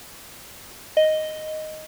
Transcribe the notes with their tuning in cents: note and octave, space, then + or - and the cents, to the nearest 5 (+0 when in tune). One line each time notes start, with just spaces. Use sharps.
D#5 +0